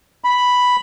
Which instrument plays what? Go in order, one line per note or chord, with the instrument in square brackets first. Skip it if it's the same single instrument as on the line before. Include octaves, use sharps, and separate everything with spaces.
[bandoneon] B5